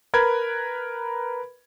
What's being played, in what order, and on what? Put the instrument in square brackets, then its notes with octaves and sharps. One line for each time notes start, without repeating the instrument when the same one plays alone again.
[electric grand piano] A#4 B4 B5 G#6